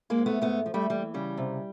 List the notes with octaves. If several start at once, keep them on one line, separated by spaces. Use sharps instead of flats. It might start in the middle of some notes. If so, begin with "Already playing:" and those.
G#3 A#3
G#2
A3 B3
G#2 A3 B3
F3
G3 A3
E3 G3
C#3 G3
C3